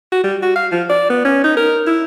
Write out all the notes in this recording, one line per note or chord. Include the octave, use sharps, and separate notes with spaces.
F#4
G3
F#4
F5
F3
D5
B3
C#4
D#4
A#4
E4